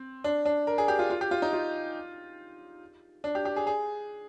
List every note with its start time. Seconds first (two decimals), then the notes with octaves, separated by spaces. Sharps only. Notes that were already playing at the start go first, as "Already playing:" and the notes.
Already playing: C4
0.24 D4
0.45 D4
0.67 A#4
0.78 G#4
0.88 G4
0.99 F4
1.10 F4
1.21 G4
1.31 F4
1.42 D#4
1.53 F4
3.24 D4
3.35 G4
3.45 G4
3.56 G#4
3.67 G#4